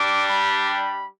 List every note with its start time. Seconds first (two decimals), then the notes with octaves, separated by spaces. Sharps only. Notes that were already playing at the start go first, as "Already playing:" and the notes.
Already playing: G3 D4 G4 D6
0.27 B5
0.69 B5